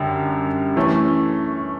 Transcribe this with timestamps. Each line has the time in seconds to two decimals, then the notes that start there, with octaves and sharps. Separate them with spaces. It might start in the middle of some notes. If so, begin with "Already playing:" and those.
Already playing: F#2 D3 G3
0.76 E3 A3 C#4